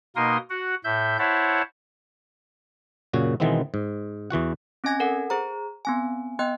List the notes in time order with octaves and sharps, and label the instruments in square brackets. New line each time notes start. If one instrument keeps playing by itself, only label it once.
[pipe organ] B2 A#3 D#4 A#4 C6 D#6
F#4 F#5
A2 E5 G6
E4 C5 C#5 E5 F#5 A5
[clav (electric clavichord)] F#2 A#2 C#3 F#4
B2 D#3 E3 G#3 B3 C4
G#2
E2 E3 F#4 F#5
[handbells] C4 C#4 D#5 G#5 G#6 A#6
A4 A#4 F#5
G#4 C5 A#5
B3 C4 G#5
B3 D#5 G5 F#6